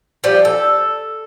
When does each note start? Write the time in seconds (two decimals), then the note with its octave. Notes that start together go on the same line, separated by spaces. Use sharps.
0.24 F3 G3
0.45 A4